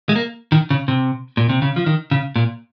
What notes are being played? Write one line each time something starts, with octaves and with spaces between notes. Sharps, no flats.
G#3
A#3
D#3
C#3
C3
A#2
C3
C#3
F3
D#3
C#3
A#2